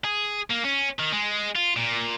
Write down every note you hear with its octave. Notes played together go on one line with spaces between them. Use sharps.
G#4
A#3
C#4
D#3
G#3
F4
A#2